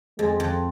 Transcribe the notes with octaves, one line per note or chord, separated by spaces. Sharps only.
F2 G#3
F2